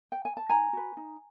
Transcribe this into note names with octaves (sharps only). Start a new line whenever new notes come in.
G5
G#5
A5
D#4 G#5 A#5
F#4 B4
D#4